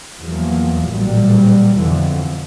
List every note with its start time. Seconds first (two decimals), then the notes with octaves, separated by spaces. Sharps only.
0.19 E2 F3 F#3 A#3
0.87 A1 A#2 F#3 G3
1.75 F2 G#2 B2 D3 E3 F3